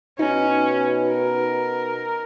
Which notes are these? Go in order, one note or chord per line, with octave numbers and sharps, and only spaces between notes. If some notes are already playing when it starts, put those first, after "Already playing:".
B2 C#4 D#4
A#4